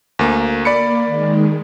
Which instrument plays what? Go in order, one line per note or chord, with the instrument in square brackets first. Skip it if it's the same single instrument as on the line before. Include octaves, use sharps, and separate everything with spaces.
[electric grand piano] D2 A#3
[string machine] A#3 [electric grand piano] D5 B5 C#7
[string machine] D#3 G#3